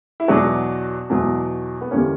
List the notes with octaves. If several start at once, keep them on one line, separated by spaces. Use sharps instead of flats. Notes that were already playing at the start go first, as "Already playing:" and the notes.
E4
E2 B2 F#3 D4 F#4
E2 B2 F#3
B3
E2 D3 G3 A#3 C#4